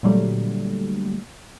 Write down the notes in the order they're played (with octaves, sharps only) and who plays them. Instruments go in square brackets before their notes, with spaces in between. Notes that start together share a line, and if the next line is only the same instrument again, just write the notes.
[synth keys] A#2 D3 F#3 G3 A3